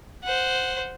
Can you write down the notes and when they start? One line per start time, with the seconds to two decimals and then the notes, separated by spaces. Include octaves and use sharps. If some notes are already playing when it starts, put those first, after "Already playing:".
0.24 C5 F#5